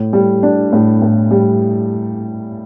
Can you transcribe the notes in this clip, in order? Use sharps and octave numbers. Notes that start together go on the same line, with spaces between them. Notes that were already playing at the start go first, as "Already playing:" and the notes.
Already playing: A2
G3
D4
A2
A2
G3